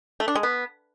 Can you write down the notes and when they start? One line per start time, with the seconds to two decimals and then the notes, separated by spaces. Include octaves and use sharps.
0.20 A3
0.28 D4
0.35 G#3
0.43 B3